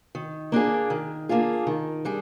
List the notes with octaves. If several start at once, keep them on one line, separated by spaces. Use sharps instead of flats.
D#3
A#3 D4 F4 G#4
D#3
A#3 D4 F4 G#4
D#3
G3 D4 G#4